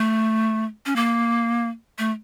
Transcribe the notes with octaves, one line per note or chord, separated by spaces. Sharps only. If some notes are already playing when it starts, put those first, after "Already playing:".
Already playing: A3
C#4
A#3
A3